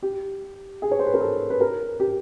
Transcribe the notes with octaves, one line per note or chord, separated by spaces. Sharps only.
G4
G#4
C#5
C5
B4
A#4
A4
B4
A#4
G4